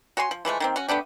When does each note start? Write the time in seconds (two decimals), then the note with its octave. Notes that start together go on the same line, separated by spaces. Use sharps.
0.17 F#4 C#5 G#5 C6
0.31 F3
0.45 E3 F3 G#3 A3
0.60 D#3 A#3 C4
0.76 C#4 F#4
0.89 A3 B3 D4 G4